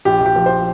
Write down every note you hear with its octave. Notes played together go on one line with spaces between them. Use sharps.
A#1 G4
A#1
G4
F3
C5